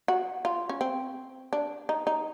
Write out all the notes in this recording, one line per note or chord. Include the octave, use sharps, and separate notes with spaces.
F#4
F4
C#4
C4
D4
D#4
D#4